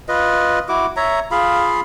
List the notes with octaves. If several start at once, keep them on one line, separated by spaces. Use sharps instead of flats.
F4 B4 D#5
E4 F#4 D6
C#5 E5 A#5
F4 G#4 F5 B5